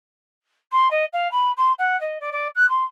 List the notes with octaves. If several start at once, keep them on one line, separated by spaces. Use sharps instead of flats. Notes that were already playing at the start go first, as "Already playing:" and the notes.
C6
D#5
F5
B5
C6
F#5
D#5
D5
D5
F#6
C6